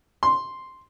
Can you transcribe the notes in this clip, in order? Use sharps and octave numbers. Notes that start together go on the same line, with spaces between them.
C6